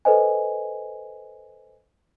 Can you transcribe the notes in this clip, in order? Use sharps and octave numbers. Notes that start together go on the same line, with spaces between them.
A4 B4 C5 D#5 G#5